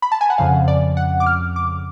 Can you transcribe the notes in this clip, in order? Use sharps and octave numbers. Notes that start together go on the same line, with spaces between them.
B5
A5
G#5
F#5
F2 C#3 F3 F5
D5
F#5
D6
F6
D6